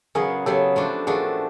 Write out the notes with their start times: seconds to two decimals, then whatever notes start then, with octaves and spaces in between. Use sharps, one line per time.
0.15 C#3 F#3 B3 G#4 A#4
0.46 C#3 F#3 B3 G4 A4
0.76 F3 A3 D4 F#4
1.07 F3 A3 D4 F#4 G#4 A#4